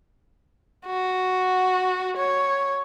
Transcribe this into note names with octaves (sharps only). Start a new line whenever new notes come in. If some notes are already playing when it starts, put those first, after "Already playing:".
F#4
C#5